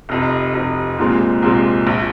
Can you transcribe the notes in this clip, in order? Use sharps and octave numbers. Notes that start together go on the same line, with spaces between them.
F1 F2 C3
F1 F2 C3
C2 A#2 G#3 C4 F4
C2 A#2 G#3 C4 F4
A#1 F3